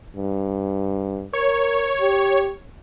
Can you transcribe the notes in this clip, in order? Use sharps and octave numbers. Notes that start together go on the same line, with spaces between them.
G2
A#4 C#5
G4